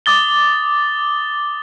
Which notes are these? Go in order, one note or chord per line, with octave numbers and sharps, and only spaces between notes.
D6 D#6 A6 G7